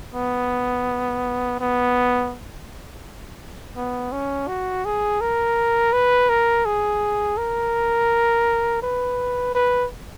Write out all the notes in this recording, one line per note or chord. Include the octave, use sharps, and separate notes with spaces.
B3
B3
B3
C#4
F#4
G#4
A#4
B4
A#4
G#4
A#4
B4
B4